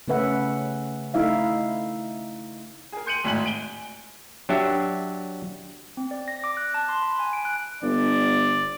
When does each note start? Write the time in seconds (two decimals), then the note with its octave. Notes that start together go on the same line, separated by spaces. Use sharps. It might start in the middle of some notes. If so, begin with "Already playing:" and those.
0.08 C#3 A3 C#4 B4 E5 F#5
1.14 A3 D#4 E4 E5 F5
2.92 G#4 A#4
3.06 C6 G6 C#7 D#7 F#7
3.24 G#1 A2 G#3 G#5 F#7
3.44 G#5 D7 G7
4.49 F#3 D4 G4 E5
5.97 C4
6.11 D5
6.28 A#6
6.44 D6
6.57 F#6
6.74 A5
6.89 C6
7.02 B5
7.19 G#5
7.33 D7
7.45 F#6
7.83 G1 D5